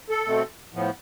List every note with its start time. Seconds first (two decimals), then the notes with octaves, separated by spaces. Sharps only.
0.10 A4
0.26 B2 A3 C4
0.73 A2 F3 B3